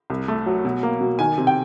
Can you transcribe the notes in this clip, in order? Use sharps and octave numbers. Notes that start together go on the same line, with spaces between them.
C2
A3
F#3
B2
A#3
B2
D#3 G#5
C3
G5